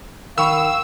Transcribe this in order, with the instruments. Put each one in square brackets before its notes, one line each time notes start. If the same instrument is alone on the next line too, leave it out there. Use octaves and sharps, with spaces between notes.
[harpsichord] D#3 [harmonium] F5 [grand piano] B5 C#6 [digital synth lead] E6